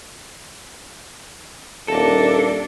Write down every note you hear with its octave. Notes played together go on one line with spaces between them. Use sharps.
D#1 A#3 D4 A4